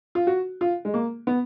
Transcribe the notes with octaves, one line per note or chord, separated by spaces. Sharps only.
F4
F#4
F4
G#3
A#3
B3